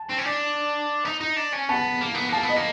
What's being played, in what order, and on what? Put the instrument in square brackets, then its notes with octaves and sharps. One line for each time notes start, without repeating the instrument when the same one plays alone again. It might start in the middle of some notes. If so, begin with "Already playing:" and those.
Already playing: [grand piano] A5
[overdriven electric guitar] C4
C#4
D4
D#4
D#4
D4
C#4
[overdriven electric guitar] B3 [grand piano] A5
[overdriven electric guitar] A#3
B3
[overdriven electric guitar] A#3 [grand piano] A5
[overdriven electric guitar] B3
[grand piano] D#5
[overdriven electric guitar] A#3